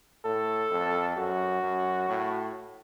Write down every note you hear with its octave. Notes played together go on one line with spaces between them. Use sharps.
A2 A4
F2
F#2 F#4
F#2
A2